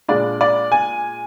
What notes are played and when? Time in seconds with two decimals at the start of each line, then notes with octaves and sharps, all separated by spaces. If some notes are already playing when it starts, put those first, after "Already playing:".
0.08 A#2 G#3 D4 D5
0.41 D5
0.72 G#5